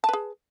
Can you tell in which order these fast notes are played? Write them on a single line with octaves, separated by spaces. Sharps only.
A5 B4 G#4